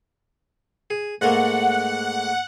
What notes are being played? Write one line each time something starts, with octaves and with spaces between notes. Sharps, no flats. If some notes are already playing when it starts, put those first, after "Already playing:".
G#4
G#2 A3 A#3 F#5